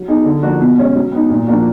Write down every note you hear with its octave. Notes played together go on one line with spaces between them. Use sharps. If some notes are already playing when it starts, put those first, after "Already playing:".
Already playing: F#3
B3 D#4 G#4
D3
F3 A#3 D4 F#4
B2
G#3 C#4
F#3
B3 D#4
A#2
F3 A#3 D4 F#4